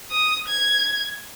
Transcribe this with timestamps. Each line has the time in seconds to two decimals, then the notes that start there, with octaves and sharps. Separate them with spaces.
0.11 D#6
0.48 G#6